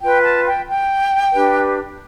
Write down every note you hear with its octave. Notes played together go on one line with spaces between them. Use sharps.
F4 B4 G5
A5
G5
G5
D4 G4 B4